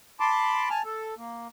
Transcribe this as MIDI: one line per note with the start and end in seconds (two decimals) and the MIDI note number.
0.20 0.69 81
0.20 0.69 83
0.20 0.69 84
0.20 0.69 86
0.70 0.82 80
0.70 0.82 81
0.70 0.82 89
0.85 1.15 69
1.18 1.48 58